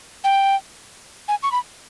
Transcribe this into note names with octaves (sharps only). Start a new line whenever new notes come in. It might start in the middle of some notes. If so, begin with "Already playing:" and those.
G5
G#5
C#6
B5